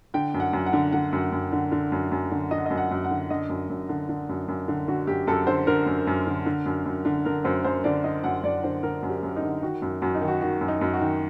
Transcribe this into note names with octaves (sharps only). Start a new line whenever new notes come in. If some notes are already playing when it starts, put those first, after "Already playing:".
D3 G5
F#2
F#5
F#2
F#5
D3
D3 F#5
F#2
F#2
D3
D3
F#2
F#2
D3
D3 D#5
F#5
F#2 D#5
F#5
F#2
F#5
D3
D3 D#5
F#2
F#2
D3
D3
F#2
F#2
D3
D3 F#4
F#2 G4
F#2 A4
D3 C5
D3 A#4
F#2
F#2
D3
D3
F#2
F#2
D3
D3 A#4
F#2 C5
F#2 C5
D3 D5
D3 D#5
F#2 F#5
F#2 D5
D3 C5
D3 A#4
F#2
G4
F#2
D#4
D3
D#3 F#4
F#2
F#2 F#4
D#4
D#3
F#4
D#3 F#4
F#2
D#4
F#2
F#4
D#3